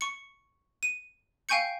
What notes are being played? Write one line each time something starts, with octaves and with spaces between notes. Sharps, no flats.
C#6 C#7
D#7
F5 G5 G#5 C#6 G6 C#7